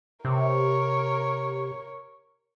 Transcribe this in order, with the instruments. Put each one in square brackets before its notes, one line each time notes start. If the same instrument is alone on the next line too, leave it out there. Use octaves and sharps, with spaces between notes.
[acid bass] C3 [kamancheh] A#4 C#5